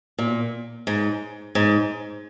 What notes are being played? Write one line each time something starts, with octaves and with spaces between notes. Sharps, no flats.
A#2
G#2
G#2